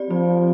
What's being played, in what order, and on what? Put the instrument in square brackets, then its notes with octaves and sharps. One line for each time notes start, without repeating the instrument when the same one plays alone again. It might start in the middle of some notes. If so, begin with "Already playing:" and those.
Already playing: [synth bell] C4 G4 D5
[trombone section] F3 [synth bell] C4